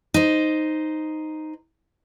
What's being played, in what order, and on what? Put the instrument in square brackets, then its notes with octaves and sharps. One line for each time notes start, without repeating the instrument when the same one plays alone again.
[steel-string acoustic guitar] D#4 C5